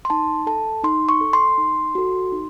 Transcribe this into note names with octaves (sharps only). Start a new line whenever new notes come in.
C6
D#4 A5
A4 A5
D#4 C6
C#6
A4
C6
D#4
F#4 A4
D#4